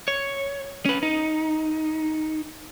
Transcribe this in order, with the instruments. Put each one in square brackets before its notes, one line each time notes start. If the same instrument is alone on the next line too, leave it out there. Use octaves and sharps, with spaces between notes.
[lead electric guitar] C#5
C#4 B4
D#4